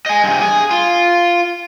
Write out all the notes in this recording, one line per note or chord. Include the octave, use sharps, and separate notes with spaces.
D#5 G#5
G2 C3
G#4
F4